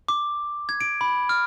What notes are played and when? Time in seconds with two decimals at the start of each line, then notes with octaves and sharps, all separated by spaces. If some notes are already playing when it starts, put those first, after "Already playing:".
0.08 D6
0.69 G#6
0.81 D7
1.01 B5
1.29 F6